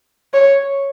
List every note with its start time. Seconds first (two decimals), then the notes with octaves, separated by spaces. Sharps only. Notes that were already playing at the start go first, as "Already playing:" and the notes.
0.33 C#5